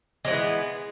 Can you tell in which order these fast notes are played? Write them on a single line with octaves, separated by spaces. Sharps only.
G#3 F#3 E3 B3